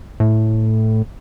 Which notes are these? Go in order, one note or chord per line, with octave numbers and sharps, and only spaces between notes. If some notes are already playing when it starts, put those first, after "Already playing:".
A2